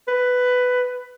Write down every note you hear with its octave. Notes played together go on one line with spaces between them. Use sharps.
B4